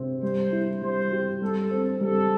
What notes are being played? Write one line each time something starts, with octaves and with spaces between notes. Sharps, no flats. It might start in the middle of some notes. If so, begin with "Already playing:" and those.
Already playing: C3 C4
G3 C5
E4
G3 C5
G4
G3 A4
C4
G3 A4